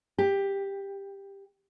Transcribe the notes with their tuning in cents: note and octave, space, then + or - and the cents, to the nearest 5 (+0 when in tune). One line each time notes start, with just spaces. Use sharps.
G4 +10